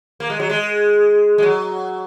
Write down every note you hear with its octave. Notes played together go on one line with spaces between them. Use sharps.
A#3
G#3
F#3
G#3
G#3
F#3